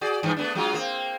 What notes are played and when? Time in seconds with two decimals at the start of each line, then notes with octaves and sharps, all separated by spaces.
0.01 F#4 G#4 D5
0.23 G2 E3
0.37 A3 B3 D4
0.55 F#3 G#3 F4
0.74 A#3 C4